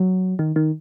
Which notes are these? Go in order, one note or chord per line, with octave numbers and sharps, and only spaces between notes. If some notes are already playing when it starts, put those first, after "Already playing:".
Already playing: F#3
D#3
D#3